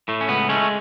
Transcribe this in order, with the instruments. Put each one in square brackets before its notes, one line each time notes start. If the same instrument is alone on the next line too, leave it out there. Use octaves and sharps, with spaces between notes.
[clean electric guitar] A2 A3
C#4
C#2 B3
G#3 A3 C#4